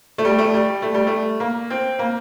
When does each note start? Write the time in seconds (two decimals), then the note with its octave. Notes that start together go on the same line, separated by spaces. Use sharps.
0.18 A3
0.25 G3
0.38 A3
0.54 G3
0.82 A3
0.94 G3
1.07 A3
1.40 A#3
1.70 C4
1.99 A#3